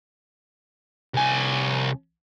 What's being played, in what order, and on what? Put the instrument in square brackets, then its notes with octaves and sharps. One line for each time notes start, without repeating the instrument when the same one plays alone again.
[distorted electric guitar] C2 G#5